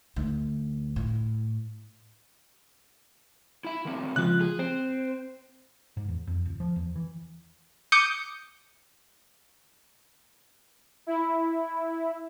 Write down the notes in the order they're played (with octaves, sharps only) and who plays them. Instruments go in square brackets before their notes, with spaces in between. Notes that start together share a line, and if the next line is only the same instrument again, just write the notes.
[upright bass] D2
A2
[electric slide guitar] E4 E5
D#3 A3 C4
[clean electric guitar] C#2 F3 F4 [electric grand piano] F#6
[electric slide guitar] G#4
[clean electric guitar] C4 [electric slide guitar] C5
[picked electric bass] G#2
E2
F2
D1
F3
E2
E3
[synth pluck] D6 D#6 G6 C#7
[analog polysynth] E4